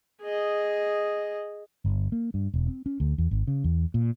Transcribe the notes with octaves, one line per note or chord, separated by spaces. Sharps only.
G#4 D#5
G1
A#3
G2
E1
C4
C#4
D2
E2
G#1
C#3
E2
A#2